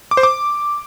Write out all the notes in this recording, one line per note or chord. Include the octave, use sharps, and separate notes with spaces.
D6
C5
D6